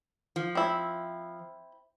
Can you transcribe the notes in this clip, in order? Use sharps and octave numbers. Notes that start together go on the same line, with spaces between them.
F3
C4 E4